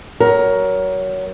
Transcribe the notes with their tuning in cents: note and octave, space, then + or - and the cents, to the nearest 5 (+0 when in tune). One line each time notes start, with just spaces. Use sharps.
F#3 +20 A#4 +15